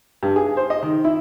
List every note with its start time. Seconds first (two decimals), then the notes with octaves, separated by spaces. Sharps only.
0.23 G2
0.36 G#4
0.57 C5
0.70 D#5
0.83 D#3
1.05 E4